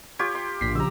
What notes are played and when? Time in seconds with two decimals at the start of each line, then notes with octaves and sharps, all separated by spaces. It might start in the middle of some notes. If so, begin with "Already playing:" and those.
0.19 F4 G4 C#5
0.35 C6
0.61 A#1 A2 B6 C7
0.75 C#3 F3 G4 A#5 E6